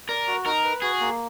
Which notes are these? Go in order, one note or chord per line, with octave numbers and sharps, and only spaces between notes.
A#4 D5
F#4
D#4 A#4
B4
F#4 G#4
A#3